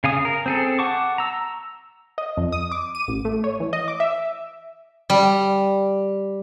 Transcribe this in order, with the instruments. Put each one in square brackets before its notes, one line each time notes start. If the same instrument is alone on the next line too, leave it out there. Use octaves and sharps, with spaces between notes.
[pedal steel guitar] C#3 F5 G#5 D#6
A#4
C4 G#4 A4
F#5 A5 C#6 D6
A#5 E6
[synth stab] D#5
F2
D#6
D6
D#7
A1
A3
C#5
E3
D#5
D6
E5
[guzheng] G3